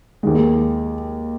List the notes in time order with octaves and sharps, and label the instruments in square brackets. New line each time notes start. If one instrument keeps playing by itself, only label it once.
[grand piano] D#2 D#3 G#3